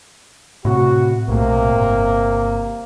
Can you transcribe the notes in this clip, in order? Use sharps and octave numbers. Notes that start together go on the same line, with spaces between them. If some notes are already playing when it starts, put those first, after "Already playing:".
A2 C3 F#4
B1 A2 C3 A#3
G1